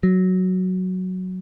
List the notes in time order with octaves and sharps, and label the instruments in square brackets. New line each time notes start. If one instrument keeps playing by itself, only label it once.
[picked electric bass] F#3